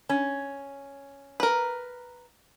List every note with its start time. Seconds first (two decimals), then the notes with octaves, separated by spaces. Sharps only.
0.09 C#4
1.40 A#4 B4